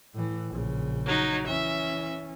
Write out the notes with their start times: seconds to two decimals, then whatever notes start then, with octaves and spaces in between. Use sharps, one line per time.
0.14 A2 E3
0.48 A#1 C#3
1.06 F#3 D#4
1.47 E3 C#4 E5